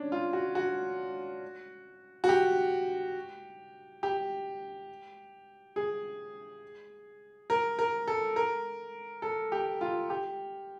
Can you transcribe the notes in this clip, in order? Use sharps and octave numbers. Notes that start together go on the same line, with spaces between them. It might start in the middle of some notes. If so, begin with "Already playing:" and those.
Already playing: C#4 D4
F4
F#4
F#4
F#4
G4
G4
G#4
A#4
A#4
A4
A#4
A4
G4
F4
G4